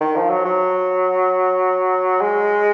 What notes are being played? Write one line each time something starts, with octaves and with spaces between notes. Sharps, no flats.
D#3
F3
F#3
F#3
G#3